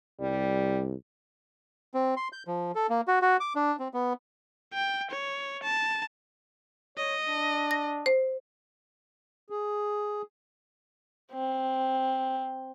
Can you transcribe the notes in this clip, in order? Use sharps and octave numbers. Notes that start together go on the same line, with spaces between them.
C2 G3
C4
C6
G6
F3
A4
A#3
F#4
F#4
D6
D4
C4
B3
G5
C#5
A5
C#5 D#5
D4
A#6
C5
G#4
C4